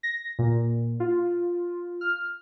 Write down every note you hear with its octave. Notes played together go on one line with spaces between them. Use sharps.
A#6
A#2
F4
F6